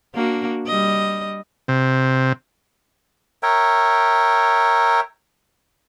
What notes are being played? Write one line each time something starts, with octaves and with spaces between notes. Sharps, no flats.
A#3 D4 F#4
G3 D#5
C3
A#4 C#5 E5 G5